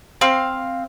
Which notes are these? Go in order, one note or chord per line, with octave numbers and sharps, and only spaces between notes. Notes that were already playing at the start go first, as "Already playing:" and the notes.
C4 F5